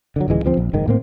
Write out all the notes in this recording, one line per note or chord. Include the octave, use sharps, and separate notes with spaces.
D3 D#3 F#3
D1 C#2 E3 G#3
D2 F3 C4
A#1
F#1 G#2 D#3
A2 A#3 C4